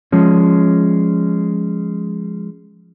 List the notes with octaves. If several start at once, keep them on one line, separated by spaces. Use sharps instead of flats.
F3 G#3 C#4